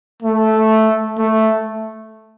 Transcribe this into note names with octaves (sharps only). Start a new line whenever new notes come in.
A3
A3